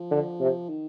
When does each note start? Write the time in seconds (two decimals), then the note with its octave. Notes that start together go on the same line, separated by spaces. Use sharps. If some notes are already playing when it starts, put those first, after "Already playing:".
Already playing: F3
0.11 D3
0.40 C3
0.69 D#3